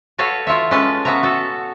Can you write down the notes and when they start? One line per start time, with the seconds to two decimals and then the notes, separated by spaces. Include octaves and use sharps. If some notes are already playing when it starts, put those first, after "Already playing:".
0.18 F#4 A4 B4 C#5 F5
0.47 E4 F4 C#5 E5
0.71 G#3 C#4 A4 B4 A5
1.05 B3 C#4 F#4 E5 A#5
1.23 F#4 A4